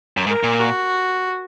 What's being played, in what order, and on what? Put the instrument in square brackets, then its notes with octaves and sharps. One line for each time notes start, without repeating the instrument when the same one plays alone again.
[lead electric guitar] F#2
[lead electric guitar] G#2 [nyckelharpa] A#4
[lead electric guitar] A#2
[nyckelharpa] F#4